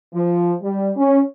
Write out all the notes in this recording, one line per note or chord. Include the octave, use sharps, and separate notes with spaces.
F3
G3
C#4